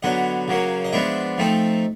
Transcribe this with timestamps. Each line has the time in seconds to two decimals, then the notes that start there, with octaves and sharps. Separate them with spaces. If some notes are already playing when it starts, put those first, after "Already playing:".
0.03 D3 F#3 B3 D#5
0.48 C#3 F#3 A#3 C#4
0.85 D#5
0.93 F3 G#3 B3 D4 E5
1.38 F3 A3 C4 D#4